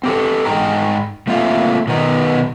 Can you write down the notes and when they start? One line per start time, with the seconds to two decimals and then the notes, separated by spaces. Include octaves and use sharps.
0.03 C4 G4 A4
0.45 G#2 D#4 G5 A#5
1.27 A3 A#3 C4 F4 E5 F5
1.88 B2 D#3 B3 D#4